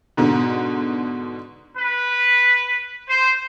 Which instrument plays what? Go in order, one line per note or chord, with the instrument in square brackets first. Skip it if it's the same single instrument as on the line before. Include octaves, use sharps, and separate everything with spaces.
[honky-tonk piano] G#2 B2 D3
[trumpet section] B4
C5